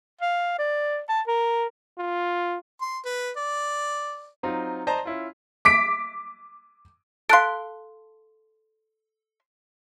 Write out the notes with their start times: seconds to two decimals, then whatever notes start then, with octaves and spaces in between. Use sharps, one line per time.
0.21 F5
0.59 D5
1.09 A5
1.27 A#4
1.98 F4
2.81 C6
3.05 B4
3.37 D5
4.43 F#3 C4 D#4 F4
4.87 C5 D5 D#5 A5 A#5
5.05 C#4 E4 F4
5.65 D6 B6 D7
7.29 A4 F5 C6 F#6 D7